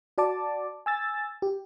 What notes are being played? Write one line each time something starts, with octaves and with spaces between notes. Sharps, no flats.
F#4 D5 A5 D6
G#5 E6 A6
G4